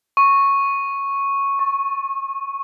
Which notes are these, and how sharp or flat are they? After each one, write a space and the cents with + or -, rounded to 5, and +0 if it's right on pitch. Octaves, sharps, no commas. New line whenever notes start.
C#6 -5
C#6 -30